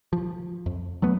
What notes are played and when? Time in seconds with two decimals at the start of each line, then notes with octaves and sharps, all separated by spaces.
0.13 F3
0.66 F2
1.02 F#3 A3 B3